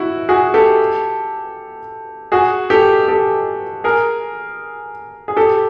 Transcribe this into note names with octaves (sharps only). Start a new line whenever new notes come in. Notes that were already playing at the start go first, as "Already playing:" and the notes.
Already playing: E4 F#4
F#4 G#4
G4 A4
F#4 G#4
G4 A4
G4 A4
G#4 A#4
G#4
G4 A4